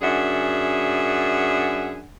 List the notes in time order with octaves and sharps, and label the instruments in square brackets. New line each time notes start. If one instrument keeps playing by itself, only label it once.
[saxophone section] F#2 D4 G#4 E5 F#5